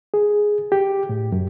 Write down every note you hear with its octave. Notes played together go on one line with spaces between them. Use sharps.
G#4
G4
A2
F#2